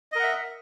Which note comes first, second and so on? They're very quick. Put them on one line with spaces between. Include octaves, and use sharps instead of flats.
D#5 A#4 F#5 E5